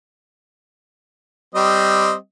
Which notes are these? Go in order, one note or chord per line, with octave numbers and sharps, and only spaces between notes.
G3 C4 D#5